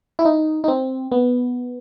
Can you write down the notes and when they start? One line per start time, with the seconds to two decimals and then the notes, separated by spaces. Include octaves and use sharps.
0.19 E4
0.25 D#4
0.64 D#4
0.68 C4
1.12 B3